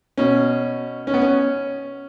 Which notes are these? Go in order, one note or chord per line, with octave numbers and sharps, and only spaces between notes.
B2 C#4
C#4
B3
C#4